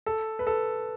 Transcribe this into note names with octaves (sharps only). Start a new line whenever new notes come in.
A4
B4
A4